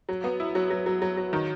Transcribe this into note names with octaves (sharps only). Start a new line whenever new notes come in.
F#3
B3
E4
F#3
F#3
F#3
F#3
F#3
D#3